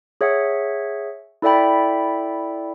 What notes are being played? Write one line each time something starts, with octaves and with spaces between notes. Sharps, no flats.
G#4 C#5 E5 F#5 C#7
E4 A4 D5 E5 G5 B5